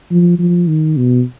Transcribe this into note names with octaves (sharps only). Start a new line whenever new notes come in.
F3
F3
D#3
B2